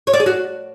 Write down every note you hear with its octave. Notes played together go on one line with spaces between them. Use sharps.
C#5
D5
G#4
F#4